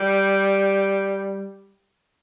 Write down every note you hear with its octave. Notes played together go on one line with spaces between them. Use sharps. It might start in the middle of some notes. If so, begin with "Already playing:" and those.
Already playing: G3